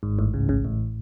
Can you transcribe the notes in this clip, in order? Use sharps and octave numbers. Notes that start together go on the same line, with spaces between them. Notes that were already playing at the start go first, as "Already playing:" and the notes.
G#1 G#2
A1 A2
C#2 C#3
C#2 C#3
A1 A2